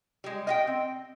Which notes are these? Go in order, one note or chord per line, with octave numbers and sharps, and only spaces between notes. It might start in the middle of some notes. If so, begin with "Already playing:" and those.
G3 G#3
D#5 F5 G5
C4